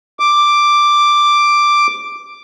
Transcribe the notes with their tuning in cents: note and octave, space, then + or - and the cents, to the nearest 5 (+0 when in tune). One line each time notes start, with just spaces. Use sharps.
D6 +5